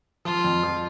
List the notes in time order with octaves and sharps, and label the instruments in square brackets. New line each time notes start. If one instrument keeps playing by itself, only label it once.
[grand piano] F3 [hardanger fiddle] F4
[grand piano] F2
F3